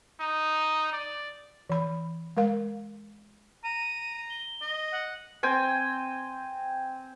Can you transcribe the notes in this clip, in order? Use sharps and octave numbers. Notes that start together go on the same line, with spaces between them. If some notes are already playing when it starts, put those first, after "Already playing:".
D#4
D5
E3 B5
G#3 A#4 F5
A#5 D#7
G7
D#5
F#5
C4 G5 G#5